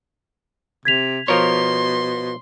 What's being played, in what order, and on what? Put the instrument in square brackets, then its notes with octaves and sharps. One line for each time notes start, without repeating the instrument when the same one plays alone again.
[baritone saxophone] C3 [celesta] G#6 B6 F7
[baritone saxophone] B2 [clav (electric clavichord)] F3 A#4 C#5 [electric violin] C6